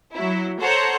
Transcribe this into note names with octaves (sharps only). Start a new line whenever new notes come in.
F#3 E4
A4 C5 C#5 F#5 A#5